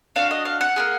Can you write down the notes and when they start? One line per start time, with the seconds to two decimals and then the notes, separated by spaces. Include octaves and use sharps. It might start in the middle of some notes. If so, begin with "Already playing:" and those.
0.16 D4 F#4 F5
0.31 D#5
0.45 F5
0.61 F#5
0.76 A#3 D#4 G#4